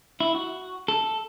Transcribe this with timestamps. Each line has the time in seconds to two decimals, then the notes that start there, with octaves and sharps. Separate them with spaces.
0.20 E4
0.35 F#4
0.88 A4